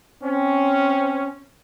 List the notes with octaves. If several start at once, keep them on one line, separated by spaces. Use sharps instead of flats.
C4 C#4